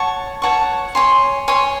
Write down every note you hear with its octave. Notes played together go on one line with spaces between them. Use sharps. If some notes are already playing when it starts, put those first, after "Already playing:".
Already playing: C#5 F#5 A5 C#6
C#5 F#5 A5 C#6
C#5 G#5 C6
C#5 G#5 C6